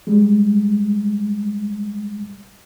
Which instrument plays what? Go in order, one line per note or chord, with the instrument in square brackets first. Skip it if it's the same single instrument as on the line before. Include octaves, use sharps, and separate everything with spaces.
[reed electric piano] G3 G#3